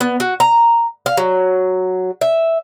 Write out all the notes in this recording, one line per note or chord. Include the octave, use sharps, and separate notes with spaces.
B3
F#4
A#5
F5
F#3
E5